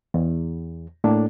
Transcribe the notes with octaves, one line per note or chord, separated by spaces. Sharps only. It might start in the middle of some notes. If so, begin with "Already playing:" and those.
E2
A2 A#3 D4